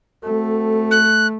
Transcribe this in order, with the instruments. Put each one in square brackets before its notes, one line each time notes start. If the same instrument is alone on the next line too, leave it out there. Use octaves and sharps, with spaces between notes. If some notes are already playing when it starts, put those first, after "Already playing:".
[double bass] A3 [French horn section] C4 F#4 A4
[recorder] F#6